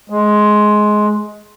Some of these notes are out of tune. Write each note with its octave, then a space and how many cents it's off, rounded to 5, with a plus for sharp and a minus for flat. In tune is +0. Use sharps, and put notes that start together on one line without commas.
G#3 +15